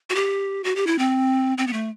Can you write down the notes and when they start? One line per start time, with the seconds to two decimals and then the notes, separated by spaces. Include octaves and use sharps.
0.10 F#4
0.15 G4
0.64 F#4
0.76 G4
0.87 E4
0.99 C4
1.58 C4
1.67 B3
1.73 A3